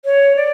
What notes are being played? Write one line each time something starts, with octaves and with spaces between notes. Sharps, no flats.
C#5
D5